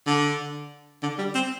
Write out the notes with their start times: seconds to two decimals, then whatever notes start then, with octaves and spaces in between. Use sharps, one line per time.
0.06 D3
1.03 D3
1.18 G3
1.35 C4